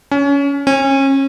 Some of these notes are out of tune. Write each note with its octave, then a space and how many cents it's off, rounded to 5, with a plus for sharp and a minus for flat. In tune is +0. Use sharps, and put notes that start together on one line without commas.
C#4 +25
C#4 -30